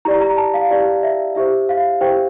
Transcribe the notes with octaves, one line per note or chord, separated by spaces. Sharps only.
E4 G4 D5 A#5
A#5
A5
F5
E4 G4 D5
E5
E4 G4 C5 E5
F5
E4 G4 C5 G5